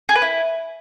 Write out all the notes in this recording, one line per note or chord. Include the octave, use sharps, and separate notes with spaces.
G#4
B4
E4